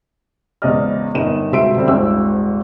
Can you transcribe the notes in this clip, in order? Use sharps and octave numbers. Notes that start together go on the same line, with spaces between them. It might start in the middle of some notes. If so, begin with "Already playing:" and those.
G#1 E2 C#3 D5 D#5 F6
G1 D#4 A#4 E7
C#2 B2 C4 E5 C6 D7
D3 G3 C4
D#1 G#1 G#2 E6